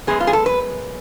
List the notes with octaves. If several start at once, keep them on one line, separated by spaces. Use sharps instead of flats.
F#2 C#3 G#3 B3 G#4
F4
G#4
A4
B4